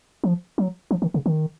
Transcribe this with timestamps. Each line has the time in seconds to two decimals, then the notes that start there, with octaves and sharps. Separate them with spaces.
0.24 F3
0.58 F#3
0.91 F3
1.02 D#3
1.14 C#3
1.26 D#3